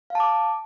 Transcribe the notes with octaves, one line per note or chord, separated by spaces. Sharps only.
F5 A5 D6